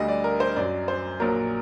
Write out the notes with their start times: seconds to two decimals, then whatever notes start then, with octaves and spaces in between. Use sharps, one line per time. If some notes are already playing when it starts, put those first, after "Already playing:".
Already playing: D2 D3 G3 D#5
0.08 D5
0.24 A#4
0.40 C5
0.56 F#2 F#3 D5
0.88 C5
1.20 A#1 A#2 F#3 A#4